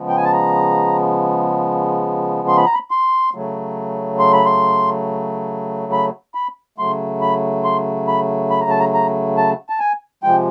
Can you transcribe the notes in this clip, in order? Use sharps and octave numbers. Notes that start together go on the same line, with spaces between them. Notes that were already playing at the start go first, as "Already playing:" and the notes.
Already playing: C#3 F3 G#3 B3
G5
G#5
A5
A#5
C6
B5
A#5
B5
C6
C#3 F#3 A3
C6
B5
C6
B5
B5
C#3 F#3 A3 C6
B5
C6
B5
B5
A#5
A5
A#5
A#5
A5
A5
G#5
C3 F3 G#3 G5